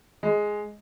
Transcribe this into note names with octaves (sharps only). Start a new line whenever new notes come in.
G#3